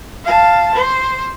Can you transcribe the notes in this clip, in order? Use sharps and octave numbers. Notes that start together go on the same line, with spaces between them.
F5 A5
C5